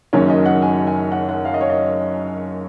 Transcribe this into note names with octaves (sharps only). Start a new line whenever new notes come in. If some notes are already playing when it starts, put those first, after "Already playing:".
F#1 F#2 D#3 F#3 C#4 C#5
D#5
F#5
G#5
G#5
F#5
F#5
F5
D#5
C#5
D#5